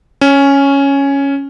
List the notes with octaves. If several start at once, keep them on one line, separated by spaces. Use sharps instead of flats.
C#4